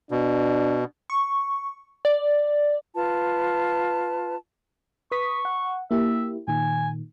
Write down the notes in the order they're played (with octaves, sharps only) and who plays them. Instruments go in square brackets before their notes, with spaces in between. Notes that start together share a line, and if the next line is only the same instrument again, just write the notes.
[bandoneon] B2 [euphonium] D4
[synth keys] C#6
D5
[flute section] F4 B4 A5
[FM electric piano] B4 D#6 B6 [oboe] C#6
[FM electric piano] F#5
[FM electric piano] A#3 E4 G4 [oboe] E5
[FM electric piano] A#2 D#3 [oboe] G#5